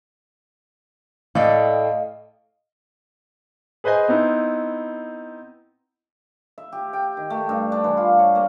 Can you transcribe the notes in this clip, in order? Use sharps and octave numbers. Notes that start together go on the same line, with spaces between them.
A2 A4 D5 D#5 F5 G5
G#4 B4 C5 D#5 G#5
B3 C4 D#4 E4
E5
G4
G5
D#3
A3
G2
D4
E3
F4
C#5
A#3